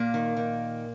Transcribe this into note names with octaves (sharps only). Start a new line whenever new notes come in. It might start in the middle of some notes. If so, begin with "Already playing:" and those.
Already playing: A#2 A#3
D#3
D#3